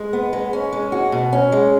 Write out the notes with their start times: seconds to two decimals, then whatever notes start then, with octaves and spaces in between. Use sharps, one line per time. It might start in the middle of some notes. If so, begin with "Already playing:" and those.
Already playing: G#3
0.13 B3
0.33 G#3
0.53 C#4
0.73 G#3
0.92 F#4
1.12 B2
1.33 C#4
1.52 G#3